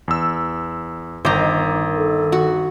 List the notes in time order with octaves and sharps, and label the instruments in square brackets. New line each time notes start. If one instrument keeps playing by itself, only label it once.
[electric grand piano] E2 E6
[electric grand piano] G1 D6 [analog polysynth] D#3 D#4 [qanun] C5 A#5
[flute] A4
[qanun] F#4